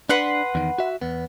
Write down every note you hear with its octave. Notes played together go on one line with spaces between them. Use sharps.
D4 B4 F#5 C6
E2 D#3
F#4 E5
E2 B3